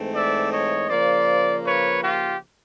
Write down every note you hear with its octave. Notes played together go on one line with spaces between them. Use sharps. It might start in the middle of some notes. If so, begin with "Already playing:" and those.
Already playing: G#2 E3 A3 C4
D5 E5
C#5 D#5
C#3 F3 A#3 C5 D5
B4 C#5
F4 G4